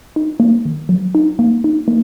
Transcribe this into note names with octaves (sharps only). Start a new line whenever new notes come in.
D#4
A#3
D#3
F#3
D#4
A#3
D#4
A#3